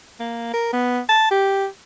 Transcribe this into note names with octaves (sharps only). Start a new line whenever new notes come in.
A#3
A#4
B3
A5
G4